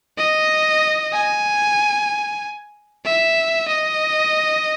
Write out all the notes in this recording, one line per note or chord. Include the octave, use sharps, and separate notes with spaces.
D#5
G#5
E5
D#5